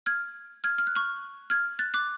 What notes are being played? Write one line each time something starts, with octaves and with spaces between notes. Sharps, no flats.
F6 G#6
F6 G#6
F6
F#6
C#6 F6
F6 G#6
F#6 A6
D6 F#6